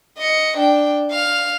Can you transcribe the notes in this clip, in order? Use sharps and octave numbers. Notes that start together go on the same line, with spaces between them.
D#5 C#7
D4 G5
F5 F7